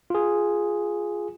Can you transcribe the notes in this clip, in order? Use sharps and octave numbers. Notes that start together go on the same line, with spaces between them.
F4 G#4